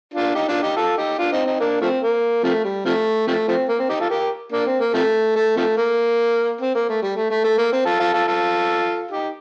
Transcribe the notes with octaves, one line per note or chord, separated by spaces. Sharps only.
D4 F4
D#4 G4
D4 F4
D#4 G4
F4 A4
D#4 G4
D4 F4
C4 D#4
C4 D#4
A#3 D4
F3 A3 C4
A#3
C3 F3 A3
G3
C3 F3 A3
C3 F3 A3
F3 A3 C4
A#3
C4
D#4 G4
F4 A4
G4 A#4
A#3 D4
C4
A#3
C3 F3 A3
A3
C3 F3 A3
A#3
C4
A#3
A3
G3
A3
A3
A3
A#3
C4
F4 A4
F4 A4
F4 A4
F4 A4
D#4 G4